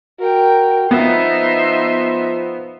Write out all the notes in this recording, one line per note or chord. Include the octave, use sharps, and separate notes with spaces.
F#4 A#4 G5
F3 B3 D#4 E5 C6